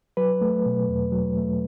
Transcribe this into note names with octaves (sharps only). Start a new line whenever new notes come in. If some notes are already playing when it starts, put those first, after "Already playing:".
F#3 B4
A3
B2
E2
F#3
A3